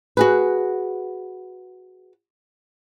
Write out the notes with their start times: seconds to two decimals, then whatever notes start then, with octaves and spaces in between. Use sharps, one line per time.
0.17 F#4 G#4 B4